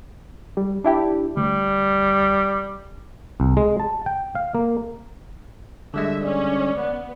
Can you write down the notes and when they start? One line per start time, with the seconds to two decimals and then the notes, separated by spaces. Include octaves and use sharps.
0.57 G3
0.84 D4 E4 G4
1.37 D2 G3
3.40 C2
3.57 G#3
3.80 A5
4.06 G5
4.35 F5
4.55 A#3
5.94 D3 G3 G#3 E5
6.24 C#4 D5
6.77 B3